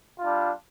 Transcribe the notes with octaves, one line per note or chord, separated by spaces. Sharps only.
G3 D4 F4